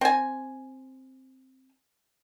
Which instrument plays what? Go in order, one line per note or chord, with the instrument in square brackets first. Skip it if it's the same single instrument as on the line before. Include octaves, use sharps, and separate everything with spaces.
[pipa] C4 G#5